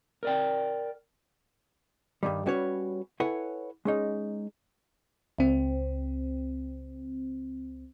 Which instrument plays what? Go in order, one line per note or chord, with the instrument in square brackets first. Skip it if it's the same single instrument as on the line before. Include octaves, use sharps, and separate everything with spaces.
[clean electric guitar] A#4 D5 G5
[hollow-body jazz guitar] G2 D#3 G3
G3 C#4 F#4 B4 C#5
E4 A4 B4 C#5 F#5 G#5
G#3 C#4 D#4
[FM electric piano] C#2 C4